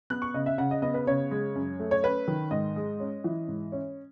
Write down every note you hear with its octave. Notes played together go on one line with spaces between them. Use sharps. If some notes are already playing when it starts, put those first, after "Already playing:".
B3 F#6
C#6
C#3 D#5
E5
C#3 F#5
D#5
B3 D#5
B4
C#3 C#5
G#3
F#2
A3
C#5
C#4 B4
D#3
G#2 D#5
G#3
C#4
E3
G#2
C#4